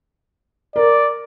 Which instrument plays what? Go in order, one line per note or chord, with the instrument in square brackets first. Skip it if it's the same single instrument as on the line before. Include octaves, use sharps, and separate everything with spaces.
[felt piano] A#4 [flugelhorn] D5